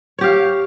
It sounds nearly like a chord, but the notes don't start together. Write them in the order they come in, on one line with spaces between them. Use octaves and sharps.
C#5 G4 F5